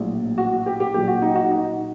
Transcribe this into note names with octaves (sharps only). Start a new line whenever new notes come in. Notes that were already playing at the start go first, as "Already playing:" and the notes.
Already playing: A#1 A2 F#3
F#4
G4
G4
A#1 A#2 F#3 G4
F#4
D#4
F#4
D#4